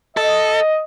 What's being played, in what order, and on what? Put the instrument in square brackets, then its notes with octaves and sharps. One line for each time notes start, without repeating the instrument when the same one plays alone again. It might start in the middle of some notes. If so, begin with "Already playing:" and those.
[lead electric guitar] A4 [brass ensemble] D#5